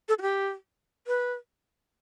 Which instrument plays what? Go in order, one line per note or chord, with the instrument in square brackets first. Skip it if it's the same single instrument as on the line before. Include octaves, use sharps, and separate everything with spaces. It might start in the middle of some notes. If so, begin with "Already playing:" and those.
[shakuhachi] A4
F#4
G4
B4